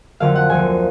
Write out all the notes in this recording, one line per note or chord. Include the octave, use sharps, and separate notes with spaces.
F2 D3 F#3 A#3 F5
F#5
D2 D3 F3 A#3 G#5